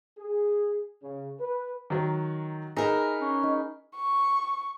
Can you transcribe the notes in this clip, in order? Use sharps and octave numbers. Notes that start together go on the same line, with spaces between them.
G#4
C#3
B4
D#3 F#3
D#4 G#4 A#4 B4 E5
C#4
D#4
C#6